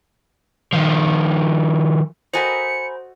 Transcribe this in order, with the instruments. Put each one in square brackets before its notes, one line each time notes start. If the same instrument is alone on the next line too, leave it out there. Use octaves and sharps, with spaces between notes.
[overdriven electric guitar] D#3 F3
[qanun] F#4 A4 D#5 [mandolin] A#4 G#5 B5 [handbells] C5 [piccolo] C#7